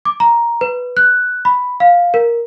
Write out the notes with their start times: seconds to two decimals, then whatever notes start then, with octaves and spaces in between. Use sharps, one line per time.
0.05 D6
0.20 A#5
0.61 B4
0.97 F#6
1.45 B5
1.80 F5
2.14 A#4